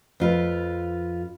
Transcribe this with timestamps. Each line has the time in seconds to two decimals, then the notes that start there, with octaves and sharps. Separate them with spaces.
0.20 F2 F4 B4